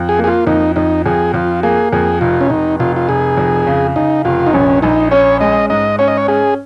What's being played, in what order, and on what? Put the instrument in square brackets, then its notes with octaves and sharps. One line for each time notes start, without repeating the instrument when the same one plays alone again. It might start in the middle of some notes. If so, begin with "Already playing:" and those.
Already playing: [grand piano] F2
[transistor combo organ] G#4
[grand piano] A#3
[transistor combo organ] G#4
F4
[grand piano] F2 [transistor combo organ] D#4
[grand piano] F2 [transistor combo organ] D#4
[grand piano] F2 [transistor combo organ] G#4
[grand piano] F2 [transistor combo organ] F4
[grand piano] A#3 [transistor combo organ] G#4
[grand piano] F2 [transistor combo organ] G#4
[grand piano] F1 [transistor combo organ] F4
[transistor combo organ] C#4
[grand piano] F1 [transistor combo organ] D#4
[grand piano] F1 [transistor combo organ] F4
[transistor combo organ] F4
[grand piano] F1 [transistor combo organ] G#4
[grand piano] F2
C#3
[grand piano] C#3 [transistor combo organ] D#4
[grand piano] F1 [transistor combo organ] F4
[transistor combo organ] D#4
[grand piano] A#1 [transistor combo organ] C#4
[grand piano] A#1 [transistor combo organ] D#4
[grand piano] C#4 [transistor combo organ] C#5
[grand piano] G#3 [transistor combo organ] D#5
[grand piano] G#2 [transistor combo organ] D#5
[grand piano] C#4 [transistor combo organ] C#5
[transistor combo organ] D#5
C#5
[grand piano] C#4 [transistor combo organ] G#4